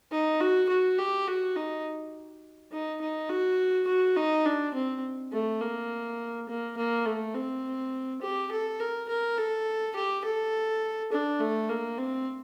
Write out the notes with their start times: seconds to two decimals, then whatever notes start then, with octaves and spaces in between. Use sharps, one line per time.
0.11 D#4
0.40 F#4
0.69 F#4
0.98 G4
1.27 F#4
1.56 D#4
2.72 D#4
3.01 D#4
3.30 F#4
3.87 F#4
4.17 D#4
4.46 D4
4.74 C4
5.32 A3
5.61 A#3
6.49 A#3
6.77 A#3
7.06 A3
7.35 C4
8.22 G4
8.51 A4
8.80 A#4
9.08 A#4
9.38 A4
9.96 G4
10.24 A4
11.12 D4
11.40 A3
11.69 A#3
11.98 C4